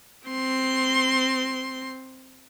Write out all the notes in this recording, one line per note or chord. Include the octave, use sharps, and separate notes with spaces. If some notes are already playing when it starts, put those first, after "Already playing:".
C4 C6